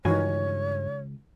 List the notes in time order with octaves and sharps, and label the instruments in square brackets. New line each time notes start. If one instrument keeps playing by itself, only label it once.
[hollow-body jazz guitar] C#2 D#5 G#5 [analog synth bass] G2 [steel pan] D#3 E3 F#4 [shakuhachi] C#5